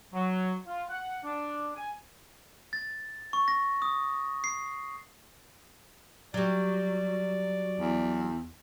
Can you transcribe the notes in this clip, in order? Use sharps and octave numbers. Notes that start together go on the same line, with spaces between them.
F#3
F4
F#5
D4
G#5
A6
C#6
A#6
D#6
C7
F#3 G3 D5
E2